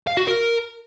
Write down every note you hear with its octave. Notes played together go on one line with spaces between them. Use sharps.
F5
F#4
A#4